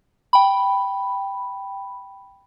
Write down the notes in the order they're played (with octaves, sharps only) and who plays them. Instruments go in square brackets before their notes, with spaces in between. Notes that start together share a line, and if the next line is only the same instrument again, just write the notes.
[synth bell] G5 B5